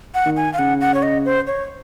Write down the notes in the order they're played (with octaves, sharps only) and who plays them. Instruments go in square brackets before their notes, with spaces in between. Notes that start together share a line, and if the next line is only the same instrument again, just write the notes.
[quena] F#5
[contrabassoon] D#3
[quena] G#5
F5
[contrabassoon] C#3 [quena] F#5
[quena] F#5
C#5
D#5
C5
C#5